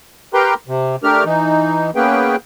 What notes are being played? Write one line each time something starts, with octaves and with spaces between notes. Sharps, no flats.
G4 A#4 B4 G5 A#5 C6
C3
A3 D4 G4 A#4 F6
E3 D#4
A#3 B3 C#4 G#4 B4 G5